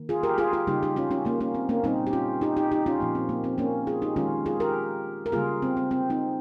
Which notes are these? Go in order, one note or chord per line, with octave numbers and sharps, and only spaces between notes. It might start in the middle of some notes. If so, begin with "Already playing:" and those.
Already playing: D#3 A#3
F4 G#4
G4 A#4
F4 G#4
F4 G#4
C#3 G3 A#3 D#4 G4
D#4 G4
C#4 F4
C#4 F4
A#3 C#4
A#3 C#4
C4
A#3 C#4
A#2 G3 A#3 C4 D#4
G4
C#4 F4
D#4 G4
D#4 G4
D#4 G4
C#4 F4
A#2 F3 A#3
C4
A#3
C4
A#3 C#4
F4 G#4
D#4 G4
D#3 G#3 C#4 F4
F4 G#4
G4 A#4
A#4
C#3 G3 A#3 F4 G#4
C4
C4
C4
C4 D#4